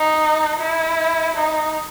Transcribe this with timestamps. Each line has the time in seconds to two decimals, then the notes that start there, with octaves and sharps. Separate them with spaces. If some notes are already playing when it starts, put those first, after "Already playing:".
Already playing: D#4
0.60 E4
1.35 D#4